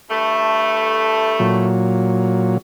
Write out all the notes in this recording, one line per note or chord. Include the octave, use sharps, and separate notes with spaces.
G2 A3
A#2 F#3